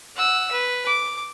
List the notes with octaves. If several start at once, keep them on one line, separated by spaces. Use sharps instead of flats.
F#5 E6
B4
D6